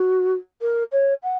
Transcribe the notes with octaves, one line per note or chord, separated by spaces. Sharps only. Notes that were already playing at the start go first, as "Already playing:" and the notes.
Already playing: F#4
A#4
C#5
F#5